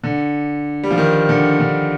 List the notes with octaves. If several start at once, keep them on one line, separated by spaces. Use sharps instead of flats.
D3
G3
F3
D#3
D3
D3